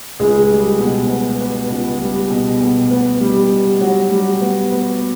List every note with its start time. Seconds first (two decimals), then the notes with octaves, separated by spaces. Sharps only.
0.20 C#2 G#3 G#4
0.50 G3
0.79 B2
1.09 B3
1.40 B3
1.70 C#2
2.00 G3
2.30 B2
2.61 B2
2.91 B3
3.21 G3
3.51 G3
3.81 F#3 G3 F#4
4.11 G3
4.41 B3
4.72 B3